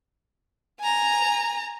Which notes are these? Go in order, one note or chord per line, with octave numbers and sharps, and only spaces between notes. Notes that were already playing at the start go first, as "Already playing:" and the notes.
G#5 A#5